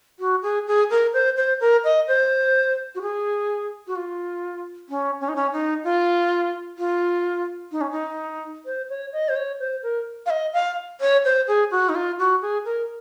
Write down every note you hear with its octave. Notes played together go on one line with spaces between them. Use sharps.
F#4
G#4
G#4
A#4
C5
C5
A#4
D#5
C5
F#4
G#4
F#4
F4
C#4
C#4
D#4
C#4
D#4
F4
F4
D#4
C#4
D#4
C5
C#5
D#5
C5
C#5
C5
A#4
F5
D#5
F5
C#5
C5
G#4
F#4
D#4
F4
F#4
G#4
A#4